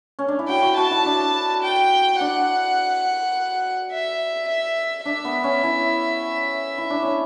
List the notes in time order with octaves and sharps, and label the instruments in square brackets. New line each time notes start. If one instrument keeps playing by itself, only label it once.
[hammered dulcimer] C#4
D4
E4
[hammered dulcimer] F#4 [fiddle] G5
[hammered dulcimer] F#4
[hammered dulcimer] F#4 [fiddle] A5
[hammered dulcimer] E4
D4
[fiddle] G5
[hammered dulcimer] D4 [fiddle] F#5
[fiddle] E5
E5
[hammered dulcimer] D4 [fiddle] E5
[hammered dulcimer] B3
C#4
E4
E4
D4
C#4